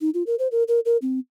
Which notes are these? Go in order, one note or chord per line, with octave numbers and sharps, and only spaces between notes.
D#4
F4
A#4
C5
A#4
A#4
A#4
C4